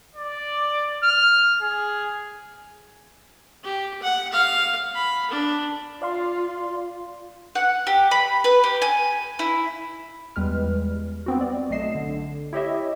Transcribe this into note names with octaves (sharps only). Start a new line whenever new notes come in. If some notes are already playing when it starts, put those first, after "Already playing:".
D5
F6
G#4
G4
F#5
F5
B5
D4
F4 D5 F5 C6
F#5
G4
B5
B4
G4
G#5
E4
E2 G3 G#3 B4 F6
B3 C4 F#4
D5
B1 A3 D#5 C7 E7
D3
E4 G4 C#5 D#5 E5